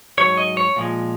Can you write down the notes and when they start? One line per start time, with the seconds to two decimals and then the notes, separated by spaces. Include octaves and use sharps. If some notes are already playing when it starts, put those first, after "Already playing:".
0.18 G#2 F#3 C#5
0.37 D#5
0.57 C#5
0.76 A#2 F3 G#3